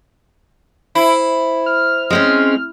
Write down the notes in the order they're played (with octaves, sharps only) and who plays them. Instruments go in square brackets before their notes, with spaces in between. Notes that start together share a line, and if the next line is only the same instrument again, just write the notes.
[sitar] E4 [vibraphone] C5
[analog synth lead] F6
[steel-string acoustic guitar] G#3 C4 C#4